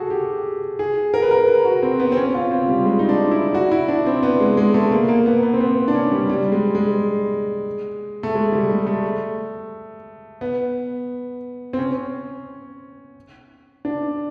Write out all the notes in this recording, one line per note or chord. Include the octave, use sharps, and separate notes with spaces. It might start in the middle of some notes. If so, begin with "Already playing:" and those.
Already playing: F#4 G#4 A4
G4
G#4
A#4
B4
A#4
B4
F#4
C4
B3
C4
C#4
F4
C4
G3
G#3
D#4
D4
E4
F#4
E4
D4
C4
B3
G#3
G#3
A3
A#3
A#3
B3
B3
C4
B3
D4
C#4
G3
G3
G#3
G#3
A3
G#3
G3
G#3
A3
B3
C4
C#4
D4